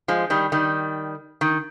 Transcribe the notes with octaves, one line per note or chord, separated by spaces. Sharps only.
F3 G#3
D#3 G3
D#3 G3
D#3